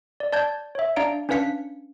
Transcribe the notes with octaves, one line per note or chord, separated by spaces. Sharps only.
D5
D5 A5 G6 G#6
C#5 E5
D4 D5 F5 A#5 C#7 D7
C#4 D4 B4 F5 B6 C#7